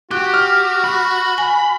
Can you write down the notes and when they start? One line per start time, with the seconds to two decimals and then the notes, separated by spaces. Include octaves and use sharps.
0.11 F#4 G4 F#6
0.34 F6
0.84 B5
1.38 G#5